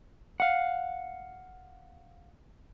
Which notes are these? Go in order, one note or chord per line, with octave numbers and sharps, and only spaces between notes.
F5 F#5